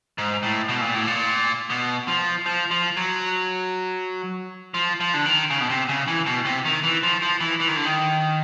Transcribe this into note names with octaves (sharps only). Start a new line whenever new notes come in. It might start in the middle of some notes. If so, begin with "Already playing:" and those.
G#2
A2
B2
A#2
A2
A#2
B2
F3
F3
F3
F#3
F3
F3
D3
D#3
C#3
B2
C3
C#3
E3
B2
C3
D#3
E3
F3
F3
E3
E3
D#3
D3
D#3